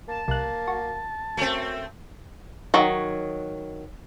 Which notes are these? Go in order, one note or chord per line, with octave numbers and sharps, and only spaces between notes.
A#3 A5
C2 A#3 F#6
F#4
F#2 A3 C4
D#3 F#3